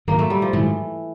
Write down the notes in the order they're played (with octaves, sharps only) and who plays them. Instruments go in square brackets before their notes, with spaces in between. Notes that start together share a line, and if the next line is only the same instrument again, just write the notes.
[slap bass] G#2 D#3 F#3 [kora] A#3
[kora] A3
G3
F3
[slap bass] G#2 D#3 F#3 [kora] E3